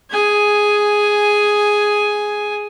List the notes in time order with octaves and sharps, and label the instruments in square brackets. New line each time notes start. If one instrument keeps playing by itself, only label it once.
[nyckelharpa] G#4 G#5